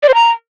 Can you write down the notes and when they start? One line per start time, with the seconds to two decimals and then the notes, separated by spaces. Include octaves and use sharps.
0.03 D5
0.09 C5
0.14 A#5